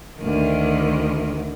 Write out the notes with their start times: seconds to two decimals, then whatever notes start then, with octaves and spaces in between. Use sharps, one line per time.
0.19 D2 D#3